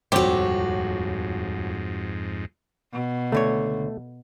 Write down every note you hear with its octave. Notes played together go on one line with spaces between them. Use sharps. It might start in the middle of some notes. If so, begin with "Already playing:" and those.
D#1 F2 G#2 C4 F#4 G4 C#5
B2
C#2 D3 A3 C#5